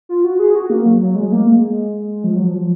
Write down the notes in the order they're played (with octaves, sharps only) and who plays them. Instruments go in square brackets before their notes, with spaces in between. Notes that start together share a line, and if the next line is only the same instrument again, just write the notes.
[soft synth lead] F4
F#4
G#4
F#4
A#3
F#3
F#3
G#3
A#3
G#3
F3
F#3
F3